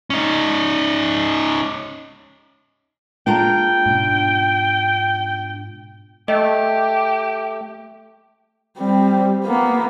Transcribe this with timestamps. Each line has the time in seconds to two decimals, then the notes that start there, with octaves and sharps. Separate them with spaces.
0.10 C#4 D#4
3.27 G#3 A#3 D4 F4 G5 A#5
3.86 G#2 B2
6.28 A3 G4 D#5
8.78 G3 C4
9.45 A#3 B3